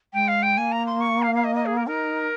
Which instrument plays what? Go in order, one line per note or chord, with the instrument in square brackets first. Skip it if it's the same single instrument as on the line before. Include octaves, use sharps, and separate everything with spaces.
[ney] G#3 [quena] G5
[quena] F5
G5
[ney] A#3 [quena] G#5
[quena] A#5
C6
C#6
F5
F5
D#5
D#5
G#4
A#4
[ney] D#4 [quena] A#4